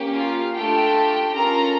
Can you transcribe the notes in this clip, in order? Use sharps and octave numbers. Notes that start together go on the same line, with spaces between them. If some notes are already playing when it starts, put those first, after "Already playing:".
Already playing: A#3 C#4 G4
F4 F5
A3 D4 F4 G4 A4 G5
C#4 F4 A4 A#4 A#5